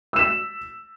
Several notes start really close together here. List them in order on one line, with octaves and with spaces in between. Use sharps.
E6 E7 B6